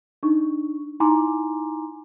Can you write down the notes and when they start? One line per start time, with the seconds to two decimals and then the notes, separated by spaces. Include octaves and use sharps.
0.23 D4 D#4 C#6
1.00 D#4 E4 G#5 A#5 C6 D6